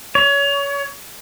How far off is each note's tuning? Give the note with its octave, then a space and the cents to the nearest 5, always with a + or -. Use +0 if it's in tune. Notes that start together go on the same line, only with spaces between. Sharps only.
C#5 +25